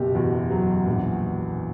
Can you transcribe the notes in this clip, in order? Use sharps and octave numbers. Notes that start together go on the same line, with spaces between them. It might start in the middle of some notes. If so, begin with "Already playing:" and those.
Already playing: F#1 B2 G4
E2 F#4
F#3
A#1